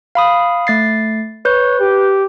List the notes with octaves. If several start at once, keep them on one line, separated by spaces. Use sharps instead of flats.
F5 B5 D#6
A3 A6 C7
B4 C#5 G6
G4